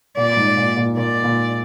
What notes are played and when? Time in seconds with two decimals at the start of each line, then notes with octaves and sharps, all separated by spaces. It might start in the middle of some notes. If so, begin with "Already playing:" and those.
0.17 A#2 D5
0.37 G#2
0.57 A#2
0.77 A#2
0.97 A#2 D5
1.24 A#2